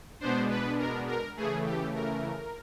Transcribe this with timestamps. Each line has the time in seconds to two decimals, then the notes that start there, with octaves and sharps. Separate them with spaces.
0.20 B2 G#3 B3 D4 C5
0.50 B4
0.78 A#4
1.08 A#4
1.36 C#3 E3 A3 G#4
1.66 G4
1.95 A#4